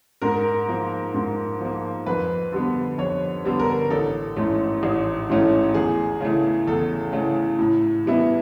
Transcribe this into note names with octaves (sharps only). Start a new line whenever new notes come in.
G#2 A#4
F3 A#3
G#2
F3 A#3
F2 B4
D3 G3 B3
F2 C#5
D3 G3 B3
A#4
A1 A4
G#2 E3 A3 C#4
A1
G#2 E3 A3 C#4
E2 G#4
C#3 E3 A3
E2 A4
C#3 E3 A3
A2
E3 G3 B3 E4